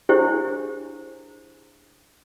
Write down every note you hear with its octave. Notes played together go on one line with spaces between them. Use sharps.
D4 E4 G4 G#4 C5 C#5